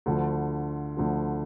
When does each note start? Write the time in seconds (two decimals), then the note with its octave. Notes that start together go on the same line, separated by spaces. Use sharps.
0.06 D2 D3 F3
0.97 D2 D3 F3